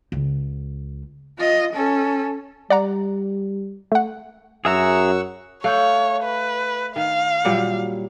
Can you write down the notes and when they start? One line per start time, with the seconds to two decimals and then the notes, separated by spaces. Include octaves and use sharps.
0.12 C#2
1.38 F4 D#5
1.73 C#4 A4
2.70 G3 D5 F#5 A#5
3.92 A3 F#5
4.65 F#2 G#4 E5 F#5 A#5 C#6 E6
5.64 A3 C#5 F5 F#6 G6
6.24 B4
6.96 D#3 F5
7.45 A#2 F#3 G3 F#5